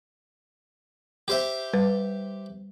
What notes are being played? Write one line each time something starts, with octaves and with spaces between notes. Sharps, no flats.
G4 C5 E5
G3 B4